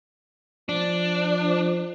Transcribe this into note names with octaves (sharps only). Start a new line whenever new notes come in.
F3 D4